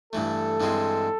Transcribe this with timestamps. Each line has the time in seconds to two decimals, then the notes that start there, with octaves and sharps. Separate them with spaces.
0.13 G2 E3 A3 A4
0.60 G2 E3 G#3 C4